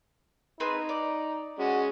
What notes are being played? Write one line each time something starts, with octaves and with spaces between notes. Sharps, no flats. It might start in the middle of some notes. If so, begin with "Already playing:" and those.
C4 D#4 G#4 B4
D5
G#3 C#4 F#4